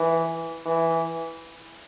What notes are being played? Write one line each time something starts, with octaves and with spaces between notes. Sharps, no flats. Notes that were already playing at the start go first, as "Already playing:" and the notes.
Already playing: E3
E3